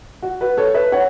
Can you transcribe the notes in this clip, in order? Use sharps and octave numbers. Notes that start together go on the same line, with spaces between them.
F#4
F#4 B4
A4 C#5
B4 E5
C#5 F#5